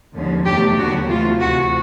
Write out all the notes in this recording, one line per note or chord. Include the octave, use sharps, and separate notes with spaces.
D#2 D3 F3 G#3 C#4
E2 B2 F#3 A3 D4 G4
D#2 D3 F#3 B3 F#4
C3 E3 A3 F4
D2 C3 E3 F#4